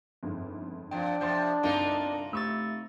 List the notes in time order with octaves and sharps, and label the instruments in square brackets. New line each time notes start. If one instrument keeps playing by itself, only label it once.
[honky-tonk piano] G1 F2 G#2
[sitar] A#2 F3 [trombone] D4 [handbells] G5
[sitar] C3 F3 [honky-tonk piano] C6 G6
[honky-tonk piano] G1 C2 D7 [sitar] A#3 D#4 F4
[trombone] C3 [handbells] A3 C#6 A6 [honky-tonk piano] E6